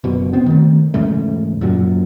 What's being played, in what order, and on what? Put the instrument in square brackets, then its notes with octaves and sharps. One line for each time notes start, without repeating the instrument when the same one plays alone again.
[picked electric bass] F#1 B2
B3 C4
D#3 A3
E2 G#2 C#3 A3
F#2 A#2 F#3